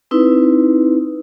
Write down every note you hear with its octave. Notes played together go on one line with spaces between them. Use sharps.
C4 D#4 E4 B4